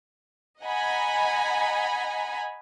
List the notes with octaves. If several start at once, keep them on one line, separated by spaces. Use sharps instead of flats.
D#5 F#5 G#5 A#5 B5